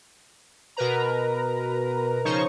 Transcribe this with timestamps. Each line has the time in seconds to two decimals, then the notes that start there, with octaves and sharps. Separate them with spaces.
0.77 B2 A#4 B4 A#5
2.25 C#3 F3 D#4 C5 C#5 C#6